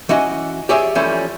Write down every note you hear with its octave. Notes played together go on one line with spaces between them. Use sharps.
E3 C#4 F#4 D#5
G4 G#4 C#5 D5 E5
E3 F3 G3 A3 C#4